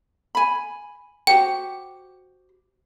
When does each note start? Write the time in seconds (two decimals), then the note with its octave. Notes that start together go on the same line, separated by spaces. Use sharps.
0.35 G#5 B5
1.27 F#4 G4 C5 G5